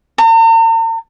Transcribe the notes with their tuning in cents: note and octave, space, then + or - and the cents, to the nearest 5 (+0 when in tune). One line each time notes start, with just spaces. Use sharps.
A#5 -45